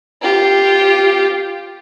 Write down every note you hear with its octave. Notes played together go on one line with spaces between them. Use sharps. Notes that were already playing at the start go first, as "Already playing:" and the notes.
F4 G4